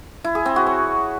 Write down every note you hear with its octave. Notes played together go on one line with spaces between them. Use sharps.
E4
G#4
C4
F#4
C#5